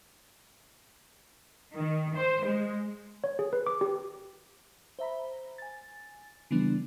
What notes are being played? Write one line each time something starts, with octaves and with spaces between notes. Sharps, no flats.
D#3
C5
G#3
C#5
G#4
B4
D6
G4
C5 E5 A#5 B5
G#5 A6
C#3 E3 F3 G3 B3 D4